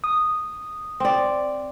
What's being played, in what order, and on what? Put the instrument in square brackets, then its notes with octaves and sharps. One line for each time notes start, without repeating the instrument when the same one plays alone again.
[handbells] D#6
[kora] C4 D5